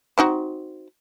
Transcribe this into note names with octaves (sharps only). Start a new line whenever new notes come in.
C4 D#4 F#4